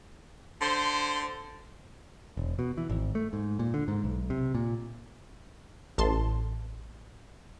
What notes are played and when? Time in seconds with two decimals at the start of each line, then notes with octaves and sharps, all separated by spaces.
0.61 D3 C5
2.37 E1
2.59 B2
2.77 E3
2.89 G#1
3.15 A3
3.33 G#2
3.59 A#2
3.74 D3
3.88 G#2
4.04 B1
4.30 C3
4.55 A#2
5.98 A1 A5 C6